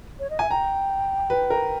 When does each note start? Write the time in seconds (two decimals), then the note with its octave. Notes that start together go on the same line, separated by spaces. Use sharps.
0.19 C#5
0.30 D#5
0.39 E5 G#5
0.50 G5 A#5
1.30 B4
1.50 A#4